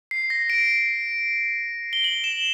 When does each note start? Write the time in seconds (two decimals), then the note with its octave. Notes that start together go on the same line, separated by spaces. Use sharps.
0.11 C7
0.30 A#6
0.50 D7
1.93 G7
2.04 F#7
2.24 E7